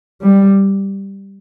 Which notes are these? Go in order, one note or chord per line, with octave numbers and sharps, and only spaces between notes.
G3